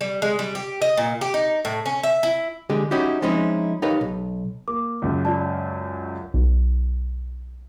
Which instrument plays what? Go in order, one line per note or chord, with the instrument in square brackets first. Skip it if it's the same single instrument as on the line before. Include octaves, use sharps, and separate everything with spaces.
[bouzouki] G3
G#3
G3
G4
D#5
A#2
G4
D#4
A2
C#4
E5
E4
[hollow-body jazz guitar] D3 G#3 G4 G#4
C#4 D#4 E4 F#4 G4
F3 G#3 C4 C#4 D#4 E4
D#4 G4 A#4 B4 C#5 F5
B1
[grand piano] A#3 [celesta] D6
[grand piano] C#2 F#2 C#3
[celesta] F4 D5 A5
[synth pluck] B1